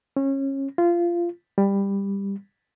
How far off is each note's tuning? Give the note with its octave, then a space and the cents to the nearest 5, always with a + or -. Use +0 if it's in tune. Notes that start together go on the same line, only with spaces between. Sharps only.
C#4 -25
F4 -20
G3 +15